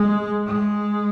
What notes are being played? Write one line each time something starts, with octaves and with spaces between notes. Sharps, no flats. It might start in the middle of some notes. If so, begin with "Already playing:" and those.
Already playing: G#3
G#3